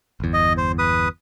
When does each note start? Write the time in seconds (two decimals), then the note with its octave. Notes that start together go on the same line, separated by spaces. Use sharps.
0.20 G1 E2
0.34 D#5
0.57 C5
0.79 B4 D#6